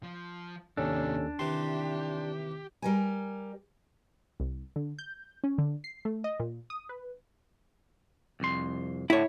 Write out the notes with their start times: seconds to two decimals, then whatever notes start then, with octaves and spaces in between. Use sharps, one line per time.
0.03 F3
0.77 D#2 A2 C3 C#4 D4 A4
1.39 D#2 C3 E3 G4 C6
2.82 G3 A#4 G#5
4.40 C2
4.76 D3
4.99 G6
5.44 C#4
5.58 D3
5.84 C7
6.05 A3
6.24 D#5
6.40 A#2
6.70 D#6
6.89 B4
8.40 C2 F2 C6
9.10 A2 D3 E4 C#5